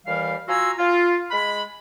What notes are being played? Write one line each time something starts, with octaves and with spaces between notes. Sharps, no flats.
D#2 E3 G3 F5
F4 F#4 G#5 A#5 C6 E6
F4
G#3 B5